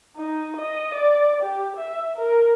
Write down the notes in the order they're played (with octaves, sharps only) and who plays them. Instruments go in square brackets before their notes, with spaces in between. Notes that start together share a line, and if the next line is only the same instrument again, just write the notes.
[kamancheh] D#4
D#5
D5
G4
E5
A#4